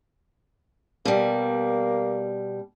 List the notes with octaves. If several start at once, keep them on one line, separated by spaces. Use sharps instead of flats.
B2 G3 A#3